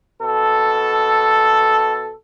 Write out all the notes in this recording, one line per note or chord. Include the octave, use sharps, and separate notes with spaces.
B2 A4